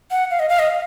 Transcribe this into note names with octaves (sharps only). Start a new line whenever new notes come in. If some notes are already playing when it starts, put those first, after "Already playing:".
F#5
F5
D#5
F5
D#5